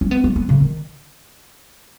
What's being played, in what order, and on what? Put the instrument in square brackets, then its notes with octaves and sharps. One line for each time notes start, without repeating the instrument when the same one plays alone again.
[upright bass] C#4
B3
B3
B3
C#3
D#3